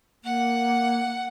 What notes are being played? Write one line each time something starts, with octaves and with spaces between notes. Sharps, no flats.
A#3 F#5